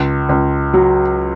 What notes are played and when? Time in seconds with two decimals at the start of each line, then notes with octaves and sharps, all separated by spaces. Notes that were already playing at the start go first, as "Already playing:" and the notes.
Already playing: C#2
0.29 C#2
0.74 F#3